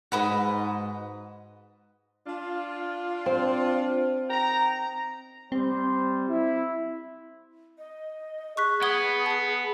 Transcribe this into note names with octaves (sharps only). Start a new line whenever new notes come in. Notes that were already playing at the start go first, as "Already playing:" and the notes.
G#2 F#4 B4 D#5
D4 F4
C4
D#4 G5 A#5
G3 C4 C5
E4
D#5
G#4 C#6 F#6 B6
B3 D#6 G#6 G7
A5 C7